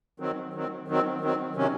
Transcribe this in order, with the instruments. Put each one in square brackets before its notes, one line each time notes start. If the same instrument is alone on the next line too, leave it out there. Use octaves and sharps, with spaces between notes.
[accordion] D#3 F#3 C4
D#3 F#3 C4
D#3 F#3 C4
D#3 F#3 C4
C3 D#3 F#3 C#4